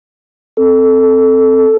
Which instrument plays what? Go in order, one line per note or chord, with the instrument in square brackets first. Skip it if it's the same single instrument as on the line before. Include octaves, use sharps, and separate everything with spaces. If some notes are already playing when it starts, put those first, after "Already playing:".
[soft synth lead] C4 [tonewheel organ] A4